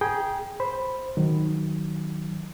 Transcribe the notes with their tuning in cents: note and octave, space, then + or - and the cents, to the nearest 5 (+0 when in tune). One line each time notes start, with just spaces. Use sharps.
G#4 +0 G5 +0 A#5 +45
C5 +0 B5 +0
D#3 +0 F#3 +0